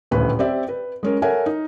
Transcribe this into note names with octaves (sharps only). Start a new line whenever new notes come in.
D#1 A1 D2 B4 B5
C4 G4 D5 E5
B4
G#3 C#4 A#4
A4 A#4 C#5 E5 F#5 G#5
D#4